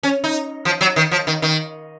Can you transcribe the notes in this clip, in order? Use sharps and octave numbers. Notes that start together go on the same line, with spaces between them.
C#4
D#4
F3
F#3
D#3
F3
D#3
D#3